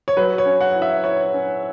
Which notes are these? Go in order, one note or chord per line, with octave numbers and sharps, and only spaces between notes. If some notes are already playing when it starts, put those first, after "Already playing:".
C#5
F#3 B4
C#5
C#4
F#5
E4
E5
E4 C#5
C#4